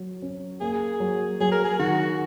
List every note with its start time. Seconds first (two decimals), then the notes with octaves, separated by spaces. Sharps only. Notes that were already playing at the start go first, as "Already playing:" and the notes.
Already playing: F#3
0.22 C#4
0.61 A#3 G#4
1.00 F#3
1.40 F#3 G#4
1.52 A#4
1.64 G#4
1.79 D#3 F#4